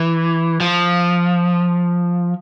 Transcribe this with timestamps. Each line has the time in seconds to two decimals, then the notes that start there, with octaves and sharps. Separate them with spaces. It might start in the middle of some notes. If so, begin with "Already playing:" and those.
Already playing: E3
0.61 F3